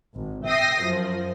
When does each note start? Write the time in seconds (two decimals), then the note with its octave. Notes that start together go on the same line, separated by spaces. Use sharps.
0.15 G#1
0.45 E5 G5 D#6 A#6 C7
0.82 F#2 F3